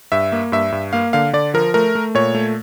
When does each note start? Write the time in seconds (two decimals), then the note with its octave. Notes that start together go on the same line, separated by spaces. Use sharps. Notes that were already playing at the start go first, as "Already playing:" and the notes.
0.12 G2 E5
0.32 A#3
0.52 G2 E5
0.72 G2
0.93 A#3 F5
1.13 D3 F5
1.33 D3 D5
1.54 F3 A#4
1.74 A3 A#4
1.95 A3
2.15 A#2 C#5
2.35 A3